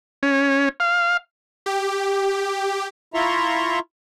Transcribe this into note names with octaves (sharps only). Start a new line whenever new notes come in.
C#4
F5
G4
E4 F4 E5 A#5 C6 C#6